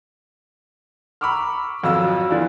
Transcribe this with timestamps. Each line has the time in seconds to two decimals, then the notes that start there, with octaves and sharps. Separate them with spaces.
1.21 A#5 B5 C#6 D6 E6 F6
1.83 G#1 F2 F3 F#3 F4 E6
2.30 E3 F3 B3 D4 F4